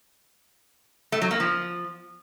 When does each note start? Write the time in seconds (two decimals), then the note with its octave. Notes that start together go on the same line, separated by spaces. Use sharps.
1.12 A3
1.22 F#3
1.31 A#3
1.40 F3